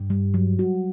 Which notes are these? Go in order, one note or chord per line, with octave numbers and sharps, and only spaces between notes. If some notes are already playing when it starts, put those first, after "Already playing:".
Already playing: G2
G3
F#3
F#4